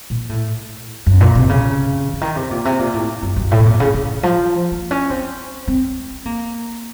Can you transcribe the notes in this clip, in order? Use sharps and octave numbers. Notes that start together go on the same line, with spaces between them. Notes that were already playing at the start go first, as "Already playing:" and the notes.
A#2
A2
F#2
A#2
C3
C#3
C#3
D#3
C3
A#2
C3
A#2
A2
F#2
F#2
A2
C3
A#2
C#3
C#3
F3
A#3
C#4
C4
C4
A#3